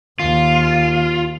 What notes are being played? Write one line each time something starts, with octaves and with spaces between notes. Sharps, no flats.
D#2 F4